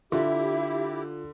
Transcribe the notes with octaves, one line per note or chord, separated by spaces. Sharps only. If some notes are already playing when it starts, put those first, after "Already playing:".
D3 E4 F4 G4 E5